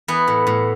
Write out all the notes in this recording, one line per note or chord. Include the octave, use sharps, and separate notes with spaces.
E3 B3
A2
A2